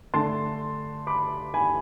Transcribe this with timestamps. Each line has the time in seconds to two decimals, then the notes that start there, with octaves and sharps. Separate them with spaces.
0.14 D3 A3 D4 A5 C6
1.07 B5 D6
1.54 G#5 B5